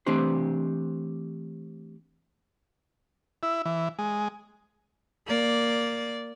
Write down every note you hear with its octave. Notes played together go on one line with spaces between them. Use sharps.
E3 A3 C4 D4 G4 C5
E4
E3
G#3
A#3 D5